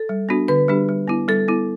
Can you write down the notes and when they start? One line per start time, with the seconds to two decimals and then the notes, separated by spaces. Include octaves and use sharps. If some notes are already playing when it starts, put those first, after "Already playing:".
Already playing: A4
0.09 G3
0.29 B3 D4 F#4
0.48 D3 B4
0.68 G3 D4 G4
0.89 G3
1.08 B3 E4
1.28 G3 A4
1.48 B3 E4